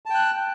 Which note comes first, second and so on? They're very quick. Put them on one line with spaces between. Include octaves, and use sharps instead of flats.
A5 G5 F#6